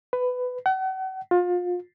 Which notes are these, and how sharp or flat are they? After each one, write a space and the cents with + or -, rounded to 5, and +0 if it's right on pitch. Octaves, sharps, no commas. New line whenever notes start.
B4 +15
F#5 +40
F4 +30